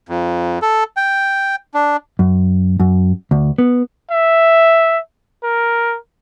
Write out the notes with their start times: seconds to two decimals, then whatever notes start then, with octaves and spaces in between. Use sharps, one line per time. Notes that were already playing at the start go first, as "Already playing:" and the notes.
0.09 F2
0.62 A4
0.97 G5
1.74 D4
2.19 F#2
2.80 F#2
3.31 D2
3.58 B3
4.12 E5
5.43 A#4